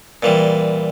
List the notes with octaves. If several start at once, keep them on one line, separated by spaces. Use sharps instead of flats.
A#2 E3 G3